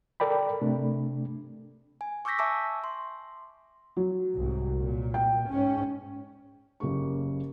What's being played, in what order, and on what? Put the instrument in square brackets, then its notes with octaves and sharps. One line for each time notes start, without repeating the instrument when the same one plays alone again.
[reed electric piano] A4 A#4 D5 G5 B5
C3 A3 D4
[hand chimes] G#5
C#6 D6 E6 G6 A#6 B6
E5 G#5 A5 C#6 D6 E6
C6
[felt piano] F#3
[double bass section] C2 G#2
A#2
[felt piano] G5
[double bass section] G#2 C#4
[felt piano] F#1 C#3 A#3 G4 C#6